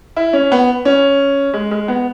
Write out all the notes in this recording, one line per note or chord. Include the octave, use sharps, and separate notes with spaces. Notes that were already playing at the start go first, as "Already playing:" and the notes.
E4
C#4
B3
C#4
G#3
G#3
B3